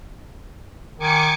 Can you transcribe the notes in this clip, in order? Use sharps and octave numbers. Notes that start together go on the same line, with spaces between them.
D#3 G#5 D6 C#7